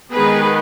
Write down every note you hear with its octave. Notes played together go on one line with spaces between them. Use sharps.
D#3 G#3 B3 G#4 B4